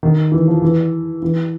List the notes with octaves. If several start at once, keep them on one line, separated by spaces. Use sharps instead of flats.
D#3
E3
F3
E3
E3